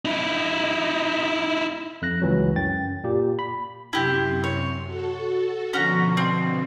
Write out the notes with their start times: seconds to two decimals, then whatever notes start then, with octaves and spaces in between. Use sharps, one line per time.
0.05 D#4 E4
2.02 F2 F#6 A#6
2.22 C#2 E3 F#3
2.56 F#2 G5 A6
3.04 A#2 A#3 G4
3.39 B5
3.93 F#2 C3 E4 G4 C6
4.44 C#5
4.85 F#4 A4
5.73 B2 D3 F3 C#4 F#4 A#5
6.17 C4